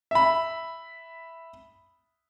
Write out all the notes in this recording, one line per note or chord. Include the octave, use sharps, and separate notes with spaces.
E5 B5